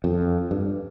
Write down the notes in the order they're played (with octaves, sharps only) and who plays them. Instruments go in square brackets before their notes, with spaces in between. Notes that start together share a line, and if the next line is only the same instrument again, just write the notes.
[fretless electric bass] F2
G2